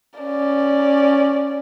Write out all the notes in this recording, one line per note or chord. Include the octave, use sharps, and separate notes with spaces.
C#4 D5